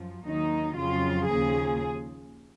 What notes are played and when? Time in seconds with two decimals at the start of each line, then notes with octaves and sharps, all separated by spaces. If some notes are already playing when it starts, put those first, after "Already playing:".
Already playing: F#2 F3
0.26 D#2 D#3 F#3 D#4
0.77 F2 C#3 F#3 F4
1.29 D#2 C#3 F3 G#4